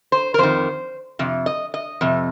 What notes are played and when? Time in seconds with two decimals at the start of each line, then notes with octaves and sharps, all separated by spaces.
0.12 C5
0.34 A#4
0.38 F2 D#3 C5
1.19 F2 C3
1.46 D#5
1.74 D#5
2.01 F2 C3